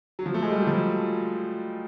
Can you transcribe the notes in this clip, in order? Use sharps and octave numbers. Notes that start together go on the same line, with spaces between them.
F#3
F3
A3
G#3
G3
F#3
F3